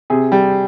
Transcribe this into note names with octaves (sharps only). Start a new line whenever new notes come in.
C3 G#4
G3